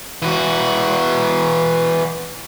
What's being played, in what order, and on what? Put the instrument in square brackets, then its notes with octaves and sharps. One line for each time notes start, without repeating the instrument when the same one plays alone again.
[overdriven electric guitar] E3 F#4